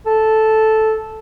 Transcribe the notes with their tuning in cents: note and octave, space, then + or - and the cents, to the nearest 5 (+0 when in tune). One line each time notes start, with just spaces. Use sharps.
A4 -5